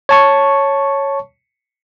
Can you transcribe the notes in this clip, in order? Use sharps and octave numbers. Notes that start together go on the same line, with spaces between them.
C#5 A5 C#6